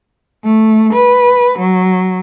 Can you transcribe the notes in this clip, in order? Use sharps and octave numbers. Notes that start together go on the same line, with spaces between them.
A3
B4
F#3